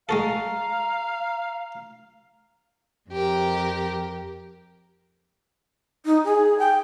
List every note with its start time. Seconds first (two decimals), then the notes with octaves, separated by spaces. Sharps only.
0.09 G#3 F#4 A4 F5 A#5
3.10 F2 G4 A#4
6.05 D#4
6.25 G#4
6.59 G5